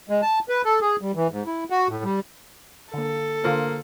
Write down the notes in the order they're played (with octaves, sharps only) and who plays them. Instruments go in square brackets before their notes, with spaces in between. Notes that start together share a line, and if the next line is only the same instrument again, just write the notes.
[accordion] G#3
A5
B4
A4
G#4
G3
E3
G#2
E4
F#4
A2
G3
[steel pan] D3 A#3 [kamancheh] A4
[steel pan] D3 F4 C5 [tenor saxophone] A#3